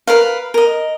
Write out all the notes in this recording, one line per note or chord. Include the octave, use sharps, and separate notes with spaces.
A#4 B4 F5
A#4 D#5